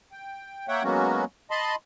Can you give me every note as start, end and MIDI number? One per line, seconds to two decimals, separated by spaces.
0.12 0.67 79
0.68 0.83 58
0.68 0.83 73
0.68 0.83 76
0.68 0.83 78
0.68 0.83 79
0.83 1.24 54
0.83 1.24 56
0.83 1.24 58
0.83 1.24 59
0.83 1.24 61
0.83 1.24 66
1.51 1.75 75
1.51 1.75 81
1.51 1.75 83
1.51 1.75 84